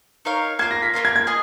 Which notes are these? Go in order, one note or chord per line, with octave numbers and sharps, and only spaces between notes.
D#4 A#4 C#5 F5
A#3 F4 A#4 F5 G#6
A#6
B6
A#3 F4 A#4 F5
G#6
G#6
G#4 D#5